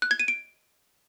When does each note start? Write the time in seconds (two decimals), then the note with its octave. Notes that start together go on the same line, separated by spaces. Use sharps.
0.02 F#6
0.11 G#6
0.19 D#7
0.28 D7